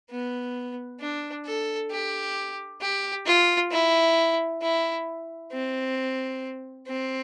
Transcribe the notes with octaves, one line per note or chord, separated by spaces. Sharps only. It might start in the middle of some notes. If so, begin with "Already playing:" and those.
B3
D4
A4
G4
G4
F4
E4
E4
C4
C4